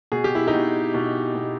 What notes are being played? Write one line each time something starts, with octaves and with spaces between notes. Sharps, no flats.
B2 G#4
G4
E4
D#4 G4
B2
B2
B2